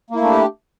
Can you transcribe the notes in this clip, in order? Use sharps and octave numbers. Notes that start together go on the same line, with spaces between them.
A3 A#3 D4 E4 G4